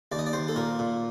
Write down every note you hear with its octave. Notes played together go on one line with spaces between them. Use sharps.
D#2 D5
D#5
D5
D#2 C5
A4
A#2 A#4
A#2